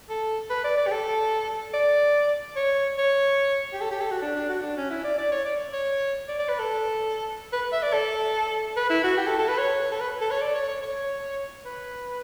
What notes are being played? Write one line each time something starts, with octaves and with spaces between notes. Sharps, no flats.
A4
B4
D5
D5
G4
A4
D5
C#5
C#5
G4
A4
G4
A4
F#4
D4
D4
F#4
D4
C#4
E4
D5
D5
C#5
D5
C#5
D5
D5
B4
A4
B4
E5
D5
A4
B4
E4
F#4
G4
A4
A4
B4
C#5
A4
B4
A4
C#5
D5
C#5
C#5
C#5
B4